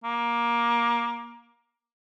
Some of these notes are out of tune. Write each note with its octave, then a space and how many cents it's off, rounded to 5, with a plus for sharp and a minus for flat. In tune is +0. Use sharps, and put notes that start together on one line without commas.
A#3 +20